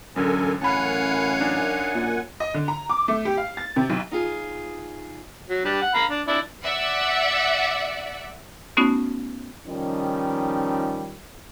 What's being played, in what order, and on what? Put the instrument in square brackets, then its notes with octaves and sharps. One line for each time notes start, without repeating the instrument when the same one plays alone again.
[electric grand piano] A1 D3 [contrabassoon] F#2 [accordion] A4 A#4 G#5
[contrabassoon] A1 [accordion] F#2 F#5 G#5 [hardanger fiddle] C#5 F5 [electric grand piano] A5 B5
[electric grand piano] D4 D#4
[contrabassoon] A#2
[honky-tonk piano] D#5
D3
A#5
D6
A3
G4
F5
A6
C3
B1
[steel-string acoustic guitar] D#4 F4 G#4
[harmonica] F#3
G3 D4
F#5
F5 A#5 B5
D4
D4 E4 D5
[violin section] D5 E5 F#5
[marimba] A3 B3 C#4 D#4 F#4
[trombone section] D#3 F3 G3 C#4 D#4